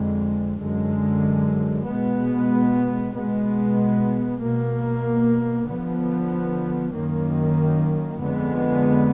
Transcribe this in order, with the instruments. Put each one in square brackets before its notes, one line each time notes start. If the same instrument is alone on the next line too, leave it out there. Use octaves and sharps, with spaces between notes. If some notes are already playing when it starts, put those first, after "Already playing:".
Already playing: [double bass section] F2 D3 G#3
F#2 D3 G#3
B2 G#3 B3
B2 G#3 B3
B2 A#3
D3 F3 B3
F#2 D#3 A#3
F2 D3 G#3 B3